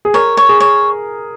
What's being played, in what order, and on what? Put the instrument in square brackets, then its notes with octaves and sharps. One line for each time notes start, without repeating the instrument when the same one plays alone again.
[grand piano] G#4
[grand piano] A#4 [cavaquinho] C#5
[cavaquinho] C#5
[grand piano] G#4
[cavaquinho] C#5